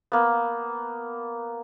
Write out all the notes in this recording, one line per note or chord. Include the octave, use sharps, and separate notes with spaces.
A#3 B3